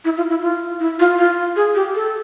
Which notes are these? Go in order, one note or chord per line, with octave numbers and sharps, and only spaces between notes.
E4
F4
E4
F4
E4
F4
F4
G#4
G4
A4